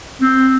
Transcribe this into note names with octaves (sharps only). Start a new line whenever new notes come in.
C4